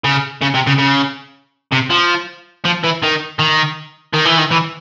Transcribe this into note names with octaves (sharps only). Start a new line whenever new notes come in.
C#3
C#3
C3
C#3
C#3
C3
F3
F3
E3
D#3
D#3
D#3
E3
D#3
E3